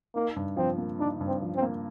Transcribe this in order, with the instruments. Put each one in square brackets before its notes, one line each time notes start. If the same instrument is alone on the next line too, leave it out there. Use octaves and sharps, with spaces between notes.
[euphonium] A#3 [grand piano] D#4
[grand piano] G2
[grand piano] F3 [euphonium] C4
[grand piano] A#3
[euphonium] D4 [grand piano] D#4
[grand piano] G2
[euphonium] C4
[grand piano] F3
[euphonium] C4
[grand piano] A#3